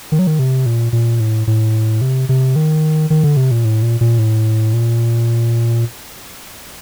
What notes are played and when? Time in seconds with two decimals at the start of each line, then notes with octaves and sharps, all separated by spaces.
0.12 D#3
0.19 F#3
0.27 D#3
0.39 C3
0.66 A#2
0.93 A#2
1.20 A2
1.47 A2
2.01 C3
2.29 C3
2.56 D#3
3.10 D#3
3.24 D3
3.37 C3
3.51 A#2
3.65 A2
3.82 A#2
4.01 A#2
4.19 A2
4.73 A#2